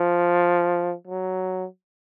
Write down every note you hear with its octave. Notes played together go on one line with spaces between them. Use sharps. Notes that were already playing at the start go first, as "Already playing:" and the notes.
Already playing: F3
F#3